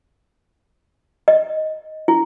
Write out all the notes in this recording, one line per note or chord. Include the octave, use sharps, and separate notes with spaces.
D#5
E4